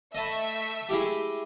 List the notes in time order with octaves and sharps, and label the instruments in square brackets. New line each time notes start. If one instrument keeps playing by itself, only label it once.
[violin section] A3 E5 [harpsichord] D#5 A5 B5
[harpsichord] G#3 E4 G4